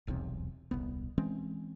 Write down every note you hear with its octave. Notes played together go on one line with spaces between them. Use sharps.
D#1 B1 E2 C3
D#1 C2 B3
E3 G#3 C4 C#4